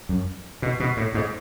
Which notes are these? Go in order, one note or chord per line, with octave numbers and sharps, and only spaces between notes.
F#2
B2
B2
A2
G#2